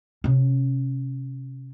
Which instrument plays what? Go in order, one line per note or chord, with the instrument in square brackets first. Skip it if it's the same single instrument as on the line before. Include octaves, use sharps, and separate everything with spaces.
[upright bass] C3 C#4